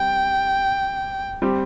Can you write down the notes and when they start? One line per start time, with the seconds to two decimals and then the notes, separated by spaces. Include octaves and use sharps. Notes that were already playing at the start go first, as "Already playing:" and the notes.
Already playing: G3 C4 G5
1.42 G3 C4 G4